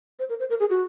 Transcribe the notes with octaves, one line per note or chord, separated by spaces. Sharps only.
C5
A#4
C5
A#4
G#4
F#4